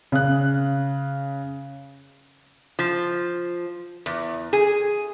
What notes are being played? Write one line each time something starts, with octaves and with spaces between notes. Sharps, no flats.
C#3 F#6
F3
E2
G#4